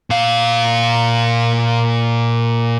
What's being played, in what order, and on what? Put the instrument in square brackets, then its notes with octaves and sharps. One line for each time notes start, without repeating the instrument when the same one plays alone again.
[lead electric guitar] A#2 F5